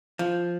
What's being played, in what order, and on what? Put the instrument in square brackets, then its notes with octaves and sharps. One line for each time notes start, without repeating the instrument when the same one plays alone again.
[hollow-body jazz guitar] F3